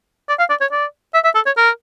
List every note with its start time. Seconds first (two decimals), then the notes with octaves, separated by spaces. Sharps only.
0.29 D5
0.39 F5
0.50 D5
0.61 C#5
0.72 D5
1.14 E5
1.24 E5
1.35 A4
1.46 C#5
1.57 A#4